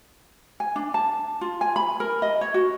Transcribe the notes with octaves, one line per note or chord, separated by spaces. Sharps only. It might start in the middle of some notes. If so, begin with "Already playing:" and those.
G#5
D4
A5
F4
G#5
B5
A#4
D#5
C#5
F#4